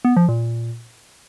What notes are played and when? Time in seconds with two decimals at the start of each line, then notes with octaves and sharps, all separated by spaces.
0.05 B3
0.17 F3
0.29 A#2